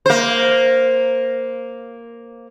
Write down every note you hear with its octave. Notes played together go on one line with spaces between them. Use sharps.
A#3 C5